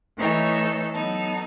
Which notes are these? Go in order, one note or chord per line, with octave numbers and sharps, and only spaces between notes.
E3 A3 D#4 A4 C#5
F#3 B3 D#4 A4